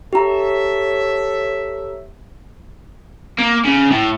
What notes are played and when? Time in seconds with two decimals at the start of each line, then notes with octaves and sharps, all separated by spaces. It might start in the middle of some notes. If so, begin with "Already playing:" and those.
0.13 G4 A4 C#5 E5 A#5
3.38 A#3
3.65 C#3
3.91 A2